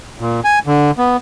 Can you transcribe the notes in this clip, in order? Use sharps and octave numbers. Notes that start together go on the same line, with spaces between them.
A#2
G#5
D3
B3